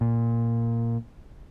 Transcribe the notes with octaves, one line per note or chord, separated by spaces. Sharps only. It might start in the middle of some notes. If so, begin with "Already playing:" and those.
A#2